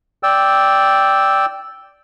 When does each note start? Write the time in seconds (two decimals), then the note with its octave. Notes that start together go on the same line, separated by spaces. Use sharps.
0.23 D5 G5 E6